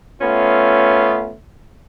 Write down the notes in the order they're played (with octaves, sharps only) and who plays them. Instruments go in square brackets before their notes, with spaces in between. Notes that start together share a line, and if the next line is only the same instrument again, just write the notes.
[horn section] A3 B3 C#4 F4